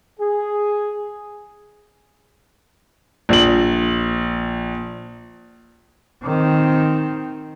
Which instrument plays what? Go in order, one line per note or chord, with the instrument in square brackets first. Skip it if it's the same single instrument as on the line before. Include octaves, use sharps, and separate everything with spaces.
[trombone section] G#4
[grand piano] A#1 F#7
[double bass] D#3 C4